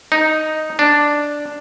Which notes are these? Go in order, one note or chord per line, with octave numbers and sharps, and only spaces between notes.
D#4
D4